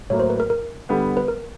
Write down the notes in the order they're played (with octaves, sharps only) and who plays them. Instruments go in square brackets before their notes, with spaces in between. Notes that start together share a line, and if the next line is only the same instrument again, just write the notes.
[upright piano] A2 F#3 A#3 [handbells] C#5
[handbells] C5
B4
A#4
A#4
[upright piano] D3 G3 B3
[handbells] B4
A#4